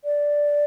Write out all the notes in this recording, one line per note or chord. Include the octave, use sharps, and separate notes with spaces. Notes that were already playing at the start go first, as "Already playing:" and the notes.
D5